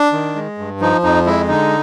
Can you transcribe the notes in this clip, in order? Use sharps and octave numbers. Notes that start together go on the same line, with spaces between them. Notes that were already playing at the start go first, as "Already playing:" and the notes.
Already playing: D4
D#3
G#3
G2
F3 D#4
F2 D#4
G#3 E4
D3 D#4